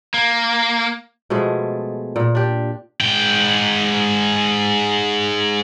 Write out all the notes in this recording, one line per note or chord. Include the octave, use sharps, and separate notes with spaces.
A#3
B2 F3 G#3 A3
A#2
D4 G4
G#2 G5